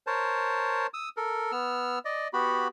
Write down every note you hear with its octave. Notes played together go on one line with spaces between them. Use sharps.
A#4 C5 C#5 A5
D#6 E6
A4 A#4
B3 E6 F6
D5 D#5
B3 F#4 G4 B5